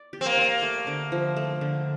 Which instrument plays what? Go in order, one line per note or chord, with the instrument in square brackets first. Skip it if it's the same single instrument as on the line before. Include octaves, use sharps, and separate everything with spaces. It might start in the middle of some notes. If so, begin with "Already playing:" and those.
Already playing: [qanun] D5
G4
[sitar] C4
A#3
[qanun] D5
A3
D3
F3
A3
D3